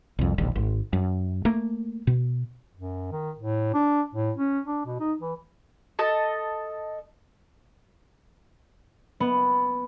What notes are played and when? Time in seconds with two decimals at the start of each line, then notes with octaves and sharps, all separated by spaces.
0.19 C2 F2
0.38 E1 A#1 D#2
0.56 G#1
0.93 F#2
1.45 A3 A#3
2.07 B2
2.76 F#2
3.12 D#3
3.37 A2
3.74 D4
4.15 A2
4.36 C#4
4.66 D4
4.86 B2
5.00 D#4
5.21 E3
5.99 A4 D#5
9.20 B3